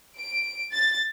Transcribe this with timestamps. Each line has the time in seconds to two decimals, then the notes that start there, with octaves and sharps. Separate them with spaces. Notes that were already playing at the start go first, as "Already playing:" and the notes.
0.17 D7
0.74 A6